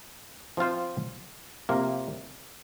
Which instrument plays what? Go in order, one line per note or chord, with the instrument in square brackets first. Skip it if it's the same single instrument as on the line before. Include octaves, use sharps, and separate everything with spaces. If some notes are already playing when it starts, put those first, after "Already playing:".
[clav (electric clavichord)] F3 C4 F4 C5
C3 F3 A#3